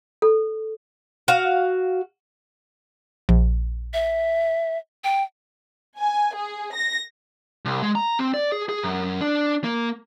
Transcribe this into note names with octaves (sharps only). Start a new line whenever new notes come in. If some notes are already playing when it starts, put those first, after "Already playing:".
A4
F#4 F5
A#1
E5
G5
G#5
G#4
A#6
C2
G#3
A#5
C4
D5
G#4
G#4
F#2
D4
A#3